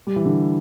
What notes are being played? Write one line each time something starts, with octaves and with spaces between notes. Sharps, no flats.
G3
E3
D3